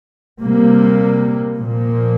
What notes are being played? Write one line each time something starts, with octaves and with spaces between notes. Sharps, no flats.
C3 G3 A#3
A#2 F3 A#3